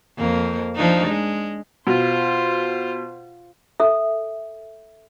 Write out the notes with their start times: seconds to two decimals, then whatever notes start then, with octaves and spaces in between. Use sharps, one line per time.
0.18 F2 A#3
0.75 F3 D4 D#4
1.07 G#3
1.87 B2 F4 C5
3.80 A4 E5